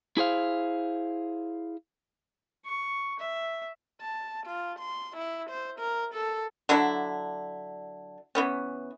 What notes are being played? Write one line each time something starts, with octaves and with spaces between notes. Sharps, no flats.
E4 G#4 C5 F5
C#6
E5
A5
F4
C6
E4
C5
A#4
A4
D3 F#3 D4 E4
E3 B3 C#4